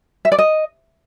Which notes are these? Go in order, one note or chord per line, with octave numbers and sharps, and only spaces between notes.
E5
D5
D#5